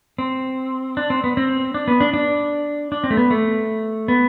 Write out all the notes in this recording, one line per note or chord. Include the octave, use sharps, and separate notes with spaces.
C4
D4
C4
B3
C4
D4
B3
D4
D4
D4
C4
A3
B3
A3
B3